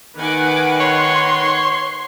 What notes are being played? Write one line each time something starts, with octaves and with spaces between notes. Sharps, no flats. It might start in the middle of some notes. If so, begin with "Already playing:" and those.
D#3 B4 F#5 G#5 D6
C#5 C6